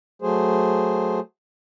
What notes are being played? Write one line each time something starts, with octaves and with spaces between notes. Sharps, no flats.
F#3 A3 G#4 C5